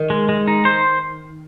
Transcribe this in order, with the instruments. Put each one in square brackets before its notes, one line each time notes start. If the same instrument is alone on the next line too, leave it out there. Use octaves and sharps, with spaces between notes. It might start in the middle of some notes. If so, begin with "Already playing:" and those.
Already playing: [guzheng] D#3
[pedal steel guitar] G#3
G#3
D#4
C5